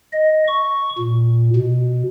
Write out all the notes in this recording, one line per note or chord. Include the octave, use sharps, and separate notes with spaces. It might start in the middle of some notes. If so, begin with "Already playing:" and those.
D#5
C#6
A#2
B2